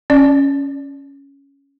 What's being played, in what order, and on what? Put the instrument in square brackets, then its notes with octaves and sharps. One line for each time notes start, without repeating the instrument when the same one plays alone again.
[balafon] C#4 D5